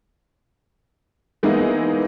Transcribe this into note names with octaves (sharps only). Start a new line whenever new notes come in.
E3 G#3 A#3 B3 D#4 E4